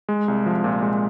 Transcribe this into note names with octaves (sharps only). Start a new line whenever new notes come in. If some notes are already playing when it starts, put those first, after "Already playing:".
G#3
C2
F3
A#2
G#3